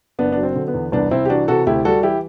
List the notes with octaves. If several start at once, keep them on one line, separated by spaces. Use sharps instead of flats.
F#1 B3 D4
F#3 D4
C4
D3
B3
E2
C2 B3 D4
C2 C4 E4
G4
E3 D4 F#4
C3 F#4 A4
D2 E4 G4
G3 F#4 A4
E3 E4 G4